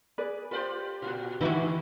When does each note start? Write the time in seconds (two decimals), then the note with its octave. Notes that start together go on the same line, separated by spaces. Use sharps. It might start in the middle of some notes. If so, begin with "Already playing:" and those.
0.18 G#4 B4 D5
0.51 F4 G4 B4 C5 D5
1.02 A#2 F4 F#4
1.41 D3 E3 D#4 E4 F#4